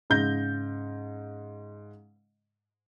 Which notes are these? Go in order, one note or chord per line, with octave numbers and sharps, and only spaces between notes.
G#2 C#3 G6 A#6